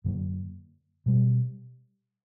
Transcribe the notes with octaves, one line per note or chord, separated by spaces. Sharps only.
F#2 D3 F#3 A#3
B2 G3